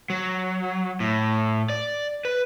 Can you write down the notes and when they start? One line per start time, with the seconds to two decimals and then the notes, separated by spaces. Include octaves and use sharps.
0.10 F#3
1.00 A2
1.70 D5
2.25 B4